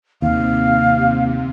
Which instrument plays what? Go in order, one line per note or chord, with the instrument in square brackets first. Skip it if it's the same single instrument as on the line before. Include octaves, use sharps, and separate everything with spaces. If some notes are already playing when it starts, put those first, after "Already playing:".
[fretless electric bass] D#2 [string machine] C3 [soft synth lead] A#3 [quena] F5